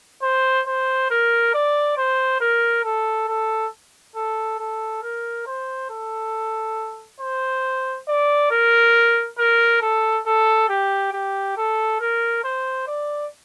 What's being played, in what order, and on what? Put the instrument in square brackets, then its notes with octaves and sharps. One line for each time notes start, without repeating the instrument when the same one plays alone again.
[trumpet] C5
C5
A#4
D5
C5
A#4
A4
A4
A4
A4
A#4
C5
A4
C5
D5
A#4
A#4
A4
A4
G4
G4
A4
A#4
C5
D5